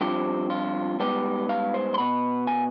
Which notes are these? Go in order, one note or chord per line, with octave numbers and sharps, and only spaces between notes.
G2 F3 C4 G4
F4
G#2 G3 B3 G4
F5
C5
C6
B2 B3 B5
G#5